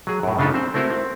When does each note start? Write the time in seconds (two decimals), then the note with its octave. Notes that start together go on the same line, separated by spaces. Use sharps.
0.07 F#3 G#4
0.23 F#2 A2
0.39 C#3 D4 D#4 F4 G4 A4
0.54 C4 C5
0.74 A3 C4 E4 F#4 A#4 C5
0.91 C4